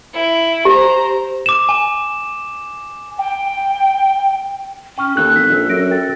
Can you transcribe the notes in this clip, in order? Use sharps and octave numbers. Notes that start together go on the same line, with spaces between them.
E4
G4 C5 A#5
D6 E7
G#5
G5
C#4 G5 C#6 F6
D#2 A4 F#6
G#1 B6
A#1
F#2 A#6 D7
A#4 G5 A6